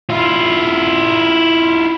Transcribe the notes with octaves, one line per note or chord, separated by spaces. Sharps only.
E4 F4